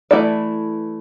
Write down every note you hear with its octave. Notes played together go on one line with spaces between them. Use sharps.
E3 A3 E4 A4 D5